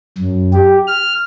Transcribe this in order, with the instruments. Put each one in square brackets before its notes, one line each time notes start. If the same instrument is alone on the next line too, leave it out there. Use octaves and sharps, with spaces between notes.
[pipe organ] F#2
G4
F6